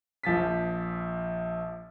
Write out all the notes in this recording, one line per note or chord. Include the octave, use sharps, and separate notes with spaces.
A#1 F3 A6 B6